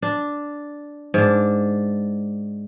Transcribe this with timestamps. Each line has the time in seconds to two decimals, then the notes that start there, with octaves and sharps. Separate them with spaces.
0.02 D4
1.14 G#2 D4